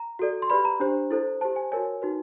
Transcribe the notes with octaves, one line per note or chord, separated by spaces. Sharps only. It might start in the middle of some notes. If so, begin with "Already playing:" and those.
Already playing: A#5
F#4 A4 D5
C6
G4 B4 D5 B5
A#5
D4 G4 C5
E4 A4 C5
G4 C5 A5
G#5
F#4 A#4 C#5 G#5
D#4 F#4 B4